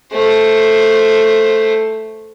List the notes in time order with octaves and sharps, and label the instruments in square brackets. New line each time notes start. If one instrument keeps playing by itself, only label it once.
[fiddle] A3 C5